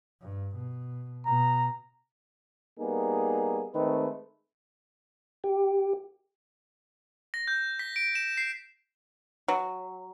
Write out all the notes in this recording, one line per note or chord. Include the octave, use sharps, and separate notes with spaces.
G2
B2
B2 A#5
G3 A#3 B3 D#4 G#4
D#3 G#3 A3 C4 B4
G4
A#6
G6
B6
D7
E7
C7
F#3